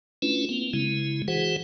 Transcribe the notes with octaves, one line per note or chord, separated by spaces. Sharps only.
A3 C#4 D4 E4 F4 B4
A#3 C4
C#3 G#3 E4
E3 F#4 G#4 C5 F#5